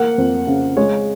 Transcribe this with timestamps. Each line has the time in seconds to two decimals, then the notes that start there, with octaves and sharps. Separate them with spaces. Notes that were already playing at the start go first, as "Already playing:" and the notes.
Already playing: A#3 F#5
0.18 F2
0.47 C#3
0.77 G#3 C#5